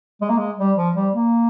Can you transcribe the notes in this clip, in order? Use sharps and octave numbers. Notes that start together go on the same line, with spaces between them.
G#3
A#3
G#3
G3
F3
G3
A#3